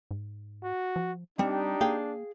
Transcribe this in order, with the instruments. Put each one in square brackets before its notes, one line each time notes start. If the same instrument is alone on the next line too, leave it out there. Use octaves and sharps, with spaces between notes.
[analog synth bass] G#2
[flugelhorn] F#4
[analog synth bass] F3
[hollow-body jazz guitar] G3 [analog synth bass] C4 [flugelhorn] D4 [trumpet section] D#4 G4
[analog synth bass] A#3 [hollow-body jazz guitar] G#4 F5 G5